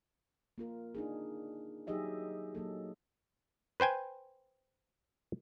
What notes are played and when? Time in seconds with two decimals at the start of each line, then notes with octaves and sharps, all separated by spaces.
0.58 A#3 F4 A#4
0.95 D4 D#4 G#4
1.87 F#3 D#4 G4 G#4 D#5 E5
2.55 F#3 A#3 A4
3.80 B4 C5 G5 G#5